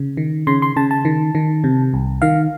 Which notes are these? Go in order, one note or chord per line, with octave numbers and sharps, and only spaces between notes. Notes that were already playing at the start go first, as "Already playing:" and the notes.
Already playing: C#3
D#3
C#3 C6
C6
C#3 A5
A5
D#3
D#3
C3
C2
D#3 F5